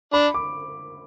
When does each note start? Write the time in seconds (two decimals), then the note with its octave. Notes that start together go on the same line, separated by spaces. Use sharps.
0.13 D4 B5
0.34 D6